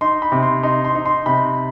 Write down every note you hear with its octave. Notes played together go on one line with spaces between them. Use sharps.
D#4 C6
B5
C3
C6
D#4 C6
C6
D#4
C6
C3 B5